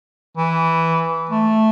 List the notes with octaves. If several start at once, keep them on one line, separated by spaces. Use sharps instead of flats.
E3
A3